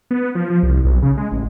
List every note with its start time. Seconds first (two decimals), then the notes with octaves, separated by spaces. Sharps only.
0.11 B3
0.35 F3
0.50 F3
0.63 C2
0.85 B1
1.02 C#3
1.17 G#3
1.32 A1